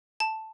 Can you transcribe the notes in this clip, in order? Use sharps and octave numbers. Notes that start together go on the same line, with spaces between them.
A5